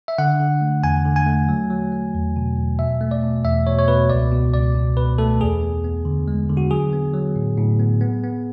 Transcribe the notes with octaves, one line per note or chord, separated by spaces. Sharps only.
E5
D3 F#5
D3
A3
E2 G#5
D3
G#5
A3
F#3
F#3
A3
E2
B2
E2
B2 E5
A3
D5
B2
E2 E5
B2 C#5
C#5
B2 B4
C#2 D5
B2
C#2 D5
B2
B2 B4
A3 A4
E2 G#4
B3
B3
D3
G#3
D3
F#4
F#3 G#4
B3
F#3
A2
A2
B3
B3
B3